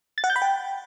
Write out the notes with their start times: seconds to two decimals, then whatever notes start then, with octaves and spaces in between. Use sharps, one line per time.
0.18 A6
0.24 F#5
0.30 G6
0.36 B5
0.42 G5